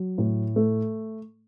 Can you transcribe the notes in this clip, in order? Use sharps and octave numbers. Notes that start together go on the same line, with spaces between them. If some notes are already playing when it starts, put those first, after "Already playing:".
Already playing: F#3
A2
A3